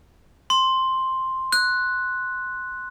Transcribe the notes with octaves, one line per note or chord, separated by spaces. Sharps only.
C6
F#6